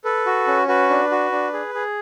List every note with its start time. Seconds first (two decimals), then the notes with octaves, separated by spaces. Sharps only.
0.04 A4 B4
0.26 F#4
0.47 C#4
0.68 F#4 B4
0.90 D4
1.11 F#4
1.32 D4
1.53 G#4
1.74 G#4